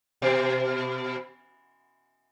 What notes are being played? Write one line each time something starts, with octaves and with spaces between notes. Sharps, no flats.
B2